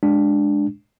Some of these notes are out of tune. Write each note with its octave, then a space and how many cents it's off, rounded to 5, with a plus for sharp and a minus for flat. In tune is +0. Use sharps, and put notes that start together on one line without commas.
G#3 +0 D4 +0